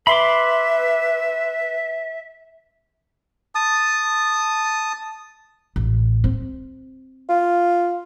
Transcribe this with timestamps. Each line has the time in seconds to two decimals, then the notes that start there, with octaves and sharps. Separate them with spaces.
0.07 B4 E5 B5 C6 D6
3.55 A5 D#6
5.76 A1
6.24 C4
7.29 F4